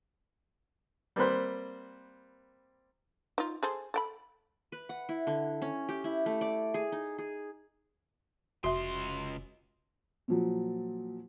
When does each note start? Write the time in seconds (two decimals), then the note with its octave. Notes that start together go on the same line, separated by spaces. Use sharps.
1.16 G3 A#3 C4 B4 C5
3.38 D#4 F4
3.63 G#4 A4 C5
3.94 A4 G5 B5
4.72 B4
4.89 F#5
5.09 E4
5.27 D3
5.62 C#4
5.89 G4
6.04 E4
6.26 A3
6.41 D5
6.74 G#4
6.92 D#4
7.18 G#4
8.64 F1 C#2 F#4 E5 C6
10.28 A#2 F3 F#3